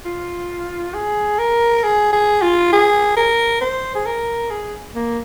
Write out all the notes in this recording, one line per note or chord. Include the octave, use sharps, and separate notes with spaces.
F4
G#4
A#4
G#4
G#4
F4
G#4
A#4
C5
G#4
A#4
G#4
A#3